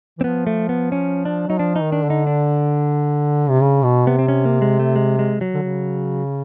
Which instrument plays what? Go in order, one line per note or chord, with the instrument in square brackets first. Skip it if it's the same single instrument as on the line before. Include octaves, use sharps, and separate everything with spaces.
[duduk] E3
[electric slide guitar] C4
[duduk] F3 [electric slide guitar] B3
[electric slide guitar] A3
B3
C#4
D4
[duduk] F#3 [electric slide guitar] D#4
[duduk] F3 [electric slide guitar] D4
[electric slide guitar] D#4
[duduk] D#3
[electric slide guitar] D4
[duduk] D3
[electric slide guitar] D#4
D4
[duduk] C3
C#3
B2
[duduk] C3 [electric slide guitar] B3
[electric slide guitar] C4
C#4
A#3
G#3
A3
G#3
G#3
F#3
[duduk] D3
C#3